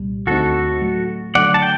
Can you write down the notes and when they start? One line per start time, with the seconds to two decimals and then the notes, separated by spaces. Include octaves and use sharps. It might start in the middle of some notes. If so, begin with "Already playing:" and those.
Already playing: C2 A#2 G3
0.27 D2 D3 A3 C4 D#4 F#4 A4
0.82 A2 F#3 A3
1.35 D3 F#3 A3 D5 F#5
1.54 A5
1.62 G5